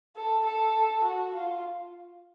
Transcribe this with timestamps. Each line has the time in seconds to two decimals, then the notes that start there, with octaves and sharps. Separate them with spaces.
0.16 A4
0.45 A4
1.04 F#4
1.34 F4